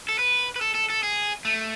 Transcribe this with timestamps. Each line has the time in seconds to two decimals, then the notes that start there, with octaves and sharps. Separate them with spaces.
0.09 A4
0.19 B4
0.56 B4
0.61 A4
0.74 A4
0.90 A4
1.03 G#4
1.45 A3